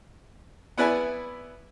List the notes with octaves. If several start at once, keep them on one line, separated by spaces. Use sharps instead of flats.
B3 E4 B4 D5 G#5